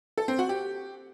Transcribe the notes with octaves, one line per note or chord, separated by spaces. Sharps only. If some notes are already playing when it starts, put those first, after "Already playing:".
A4
C4
F#4
G4